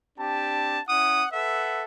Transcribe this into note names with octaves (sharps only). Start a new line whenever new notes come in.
C4 D4 G4 A5
C#4 E4 F#5 D#6
A4 B4 E5 F#5